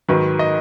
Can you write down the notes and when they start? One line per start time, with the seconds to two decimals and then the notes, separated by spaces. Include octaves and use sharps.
0.08 G#2 D#3 F#3 B4
0.39 D#5